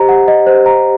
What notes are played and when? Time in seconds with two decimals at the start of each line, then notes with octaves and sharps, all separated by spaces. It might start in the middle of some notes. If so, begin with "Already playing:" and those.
Already playing: G4 C5 D#5 A#5
0.09 F#5
0.28 D#5
0.47 C5
0.66 A#5